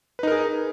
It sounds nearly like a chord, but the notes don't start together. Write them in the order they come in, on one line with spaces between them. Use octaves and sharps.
B4 D#4 A#4 G#4